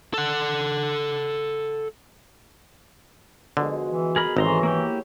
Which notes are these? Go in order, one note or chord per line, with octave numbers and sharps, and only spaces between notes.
A4 F#5
B2 D3 F3 G#3
E3
G#4 A#4 B5
G#1 E3 G#4 A4 C#5 A#5 C6
A#3 E4 G4